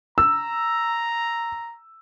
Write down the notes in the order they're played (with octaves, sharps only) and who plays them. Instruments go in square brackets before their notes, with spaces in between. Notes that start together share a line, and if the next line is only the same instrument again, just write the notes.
[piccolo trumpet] A#5 [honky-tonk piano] E6